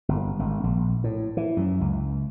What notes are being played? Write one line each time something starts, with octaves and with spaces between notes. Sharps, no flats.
G1
G#1
A#1
A2
E3
F#2
C#2